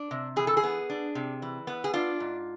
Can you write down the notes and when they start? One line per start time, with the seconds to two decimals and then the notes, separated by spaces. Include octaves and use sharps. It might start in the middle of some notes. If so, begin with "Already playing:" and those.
Already playing: D4
0.11 C3
0.36 E3 G#4
0.47 A4
0.57 G#4
0.63 B3
0.90 D4
1.15 C3
1.42 E3
1.67 B3
1.84 G#4
1.94 D4 F4
2.20 G#2